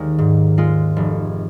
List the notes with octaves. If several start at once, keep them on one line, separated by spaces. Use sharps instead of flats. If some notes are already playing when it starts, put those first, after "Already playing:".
Already playing: D#2 D#3 G#3
G#2
G#3 F4
F1